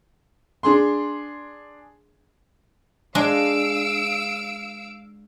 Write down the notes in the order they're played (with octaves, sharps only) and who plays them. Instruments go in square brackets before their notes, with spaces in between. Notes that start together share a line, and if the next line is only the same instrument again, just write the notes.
[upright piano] D4 G#4 C6
[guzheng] G#3 D4 [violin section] F5 E6 D7